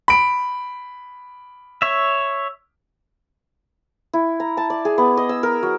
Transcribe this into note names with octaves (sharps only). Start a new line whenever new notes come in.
B5 D7
C#5 E5
E4
A#5
A5
D5
G#4
B3
D#5
E6
A#4
F#3